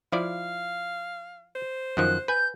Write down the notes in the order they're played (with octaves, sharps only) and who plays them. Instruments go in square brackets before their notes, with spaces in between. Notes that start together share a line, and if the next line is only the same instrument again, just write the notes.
[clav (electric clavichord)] F3 E4 D5 [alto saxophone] F5
[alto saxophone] C5
[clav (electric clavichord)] F#2 D#3 F3 [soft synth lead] F#6
[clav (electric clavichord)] B4 G#5 [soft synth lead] G6